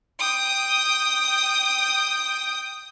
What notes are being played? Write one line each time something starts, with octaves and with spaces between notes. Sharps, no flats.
G5 D#6